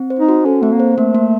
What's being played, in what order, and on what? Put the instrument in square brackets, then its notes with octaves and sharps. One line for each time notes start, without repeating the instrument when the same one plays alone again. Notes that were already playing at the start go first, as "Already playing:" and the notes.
Already playing: [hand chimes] C4
C5
[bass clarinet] D#4
[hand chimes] F#4
[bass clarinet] C#4 [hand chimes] A4
[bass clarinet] A3 [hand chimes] C4
[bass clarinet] A#3
[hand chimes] C5
[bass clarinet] A3 [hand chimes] A#3
[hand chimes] A#3